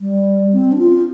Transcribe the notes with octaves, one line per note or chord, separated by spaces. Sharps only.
G3
C4
D4
F4